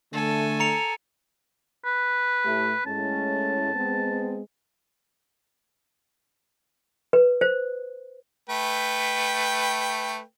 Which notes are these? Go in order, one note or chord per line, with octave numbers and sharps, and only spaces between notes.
D3 A3 A4 G#5
A#5 C#7 F7
B4
A2 A3 G4
A2 G#3 C#4 A5
G#3 B3 C4
B4
C5
A3 B4 G5